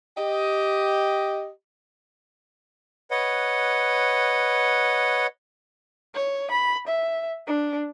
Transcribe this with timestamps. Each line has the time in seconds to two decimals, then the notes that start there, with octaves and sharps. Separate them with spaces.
0.17 G4 D#5
3.11 B4 C#5 D#5 F#5
6.15 C#5
6.51 B5
6.88 E5
7.47 D4